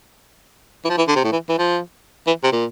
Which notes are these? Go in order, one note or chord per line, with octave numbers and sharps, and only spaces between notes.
E3
F3
E3
D3
C3
A2
E3
E3
F3
E3
C3
A#2